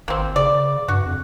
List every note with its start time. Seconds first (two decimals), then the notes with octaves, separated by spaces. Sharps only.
0.08 G#1 A#3 C4
0.36 C#3 D5
0.88 G2 F#4
1.06 F2